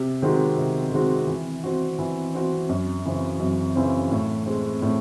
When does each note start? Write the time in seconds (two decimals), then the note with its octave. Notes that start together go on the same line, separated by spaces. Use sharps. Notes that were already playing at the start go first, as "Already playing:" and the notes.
Already playing: C3
0.22 D#3 G#3 C4 F#4
0.57 C3
0.92 D#3 G#3 C4 F#4
1.27 E3
1.63 C4 F#4
1.99 E3
2.35 C4 F#4
2.69 F#2
3.05 C#3 E3 C4
3.40 F#2
3.76 C#3 E3 C4
4.11 A2
4.46 G#3 C4
4.82 A2